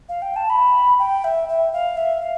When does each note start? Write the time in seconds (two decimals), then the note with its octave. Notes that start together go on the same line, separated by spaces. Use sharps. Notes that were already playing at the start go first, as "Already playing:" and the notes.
0.09 F5
0.22 G5
0.36 A5
0.50 B5
0.99 G5
1.24 E5
1.49 E5
1.73 F5
1.97 E5
2.22 F5